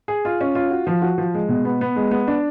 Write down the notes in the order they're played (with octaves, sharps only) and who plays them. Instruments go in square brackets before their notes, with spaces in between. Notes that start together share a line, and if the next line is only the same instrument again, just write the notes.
[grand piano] G#4
F4
C#4
F4
F#4
F3
F#4
F3
G#3
B2
B3
B3
G#3
B3
D4